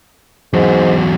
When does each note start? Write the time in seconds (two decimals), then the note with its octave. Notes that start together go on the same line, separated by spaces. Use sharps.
0.53 E2 G#2 F#3